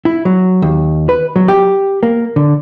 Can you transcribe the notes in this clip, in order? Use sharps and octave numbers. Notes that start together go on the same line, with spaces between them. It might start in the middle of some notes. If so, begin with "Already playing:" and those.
E4
F#3
D#2
B4
F#3
G4
A#3
D3